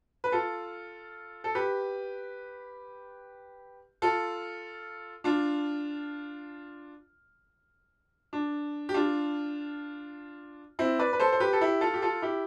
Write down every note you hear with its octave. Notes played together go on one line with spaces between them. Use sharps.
B4
F4 A4
A4
G4 B4
F4 A4
D4 F4
D4
G4
D4 F4
C4 E4
B4 D5
B4
A4 C5
C5
G4 B4
A4
E4 G4
F4 A4
G4
F4 A4
E4 G4